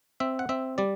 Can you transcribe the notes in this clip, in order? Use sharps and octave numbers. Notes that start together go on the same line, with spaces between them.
C4 E5
F#5
C4 E5
G3 D5